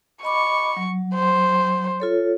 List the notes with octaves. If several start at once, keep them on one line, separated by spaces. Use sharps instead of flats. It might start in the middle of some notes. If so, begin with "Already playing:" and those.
D#5 B5 C#6 D6
F#3
C5
F4 A4 C#5